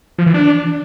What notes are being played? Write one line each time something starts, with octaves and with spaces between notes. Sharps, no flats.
F3
E3
D4